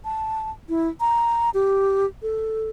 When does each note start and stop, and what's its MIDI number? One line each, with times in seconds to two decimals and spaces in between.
0.05 0.51 81
0.69 0.88 64
1.00 1.50 82
1.54 2.06 67
2.22 2.70 69